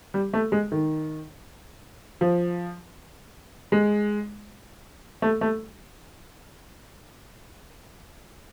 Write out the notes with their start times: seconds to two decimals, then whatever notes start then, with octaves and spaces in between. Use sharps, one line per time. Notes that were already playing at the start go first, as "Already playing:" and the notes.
0.14 G3
0.33 A3
0.52 G#3
0.72 D#3
2.21 F3
3.72 G#3
5.22 A3
5.41 A3